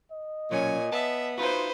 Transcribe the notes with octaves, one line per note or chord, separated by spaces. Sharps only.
D#5
B1 A#2 F#3 C#4 C#5 G#5
B3 E5 A5
D#4 F4 F#4 B4 C5